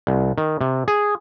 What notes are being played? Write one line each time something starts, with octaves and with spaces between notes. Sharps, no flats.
C2
D#3
C3
G#4